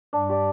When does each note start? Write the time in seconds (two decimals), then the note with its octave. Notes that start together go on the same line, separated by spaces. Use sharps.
0.13 G2 D4
0.29 G4 D5